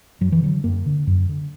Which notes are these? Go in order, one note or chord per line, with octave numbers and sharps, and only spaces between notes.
F#2 F#3
E3
D3 F#3
F#2 A#3
D3
F#2
D3